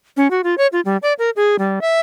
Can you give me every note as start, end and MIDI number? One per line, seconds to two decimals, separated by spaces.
0.17 0.30 61
0.31 0.41 66
0.44 0.55 65
0.58 0.67 73
0.73 0.81 65
0.85 0.97 55
1.03 1.13 74
1.19 1.30 70
1.36 1.56 68
1.59 1.79 55
1.81 2.00 76